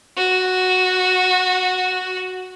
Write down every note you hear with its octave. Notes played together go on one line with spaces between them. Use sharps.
F#4